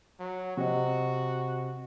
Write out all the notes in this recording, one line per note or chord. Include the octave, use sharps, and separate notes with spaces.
F#3
C3 F#4 D#5